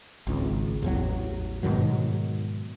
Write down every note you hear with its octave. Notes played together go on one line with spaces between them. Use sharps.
G#1 C#2
A1 E2 F#3
G#2 B2 D#3 F#3